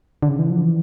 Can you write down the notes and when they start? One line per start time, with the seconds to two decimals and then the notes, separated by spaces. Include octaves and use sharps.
0.23 D3
0.28 C#3
0.39 E3
0.50 F3
0.62 E3